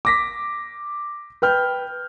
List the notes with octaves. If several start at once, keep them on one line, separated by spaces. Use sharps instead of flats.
D6 A#6 B6
B4 G5 F6 G6